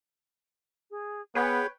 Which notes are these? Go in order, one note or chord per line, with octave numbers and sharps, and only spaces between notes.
G#4
B3 G#4 B4 C#5 F#5 G5 F6